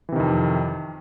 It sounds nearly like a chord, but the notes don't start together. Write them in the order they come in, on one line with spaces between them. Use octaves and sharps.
E3 C3 D#3 F2